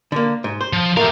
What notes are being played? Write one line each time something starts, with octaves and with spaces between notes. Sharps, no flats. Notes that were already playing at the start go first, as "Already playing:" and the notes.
D3 A#3
G#2
C5
F3
A3 G4 A#4 F5